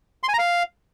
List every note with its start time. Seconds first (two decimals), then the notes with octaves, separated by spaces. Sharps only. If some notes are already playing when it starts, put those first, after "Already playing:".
0.23 C6
0.29 G#5
0.34 A#5
0.39 F5